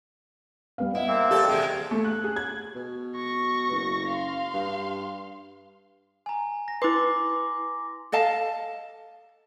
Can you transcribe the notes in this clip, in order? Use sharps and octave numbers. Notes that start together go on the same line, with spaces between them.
G3 B3 F5
E4 D#5 F#5
A#3 C4
G3 G4 A4 G5
C3 E3 G#3 G#4
A3
F#6
G#4
G#6
B2
C#6 A#6
F#1
F5 C6
G2
G#5 A#5
A#6
E4 B4 C6 D6
A4 D#5 F5 A5